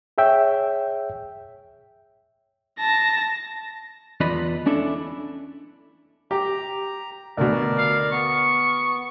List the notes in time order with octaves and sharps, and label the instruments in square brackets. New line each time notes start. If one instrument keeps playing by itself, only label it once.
[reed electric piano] G#4 C#5 E5 G5
[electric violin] A5 A#6
[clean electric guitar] E2 F4 B4 D5 D#5 B5
C#4 D4 E4 A4
[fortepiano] G4 [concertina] A#5
[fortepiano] D2 B2 [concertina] A#4 D5
[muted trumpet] F5
[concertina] B3 [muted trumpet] C#6